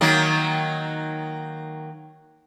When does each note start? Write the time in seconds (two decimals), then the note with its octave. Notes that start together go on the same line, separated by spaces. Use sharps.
0.01 D#3 F#3 A#3